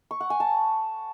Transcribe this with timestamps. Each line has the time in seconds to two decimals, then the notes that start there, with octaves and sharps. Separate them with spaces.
0.11 C#6
0.20 F#5
0.30 G#5
0.40 A5